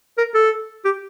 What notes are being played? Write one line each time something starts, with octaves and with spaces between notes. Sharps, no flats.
A#4
A4
G4